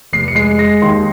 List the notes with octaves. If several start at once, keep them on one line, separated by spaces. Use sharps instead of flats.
F1 C7
C#7
G#3 C7
G#3 A#6
D#2 C6